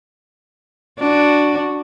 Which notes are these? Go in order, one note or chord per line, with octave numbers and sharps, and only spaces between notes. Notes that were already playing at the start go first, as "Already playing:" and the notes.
D4 F#4